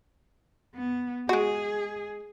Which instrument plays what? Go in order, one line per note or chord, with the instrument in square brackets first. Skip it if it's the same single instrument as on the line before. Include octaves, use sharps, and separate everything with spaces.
[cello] B3
[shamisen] G#3 F#4 [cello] G#4